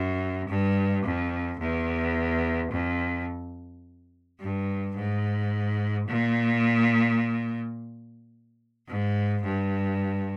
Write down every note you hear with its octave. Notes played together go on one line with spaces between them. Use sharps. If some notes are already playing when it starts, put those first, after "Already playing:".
Already playing: F#2
G2
F2
E2
F2
G2
G#2
A#2
G#2
G2